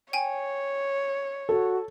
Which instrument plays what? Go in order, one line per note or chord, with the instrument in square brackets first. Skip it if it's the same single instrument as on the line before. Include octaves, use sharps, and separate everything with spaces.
[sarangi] C#5 [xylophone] G5 G#5
[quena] F#4 [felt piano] A4